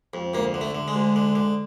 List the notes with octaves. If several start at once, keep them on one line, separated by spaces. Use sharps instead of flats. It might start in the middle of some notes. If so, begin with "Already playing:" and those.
F2
D2 A#3
D3
A3
D3
G#3
D2
D3
D3